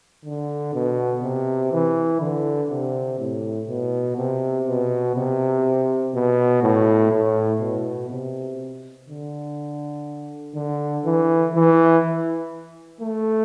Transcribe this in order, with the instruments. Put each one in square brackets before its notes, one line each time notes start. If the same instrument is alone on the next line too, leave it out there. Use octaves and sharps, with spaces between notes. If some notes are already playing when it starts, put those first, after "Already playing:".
[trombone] D3
B2
C3
E3
D3
C3
A2
B2
C3
B2
C3
B2
A2
A2
B2
C3
D3
D3
E3
E3
A3